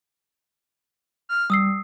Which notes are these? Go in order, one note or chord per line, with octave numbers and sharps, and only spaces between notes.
F6
G3 D#6 E6 C7